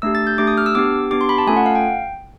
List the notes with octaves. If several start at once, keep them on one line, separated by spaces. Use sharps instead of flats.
A3 D4 G4 E6
A6
G6
A3 D4 G4 D6
D#6
F6
E6
B3 D4 G4 D6
B3 D4 G4 D6
C6
B5
A5
A3 C#4 F4 A4 G#5
F#5
F5
G5